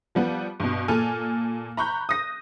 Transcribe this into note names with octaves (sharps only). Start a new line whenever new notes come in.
F3 G3 B3
G2 B2
A#2 A4 G#5 F6
A#5 B5 C#6 F#6 G6
D#6 A#6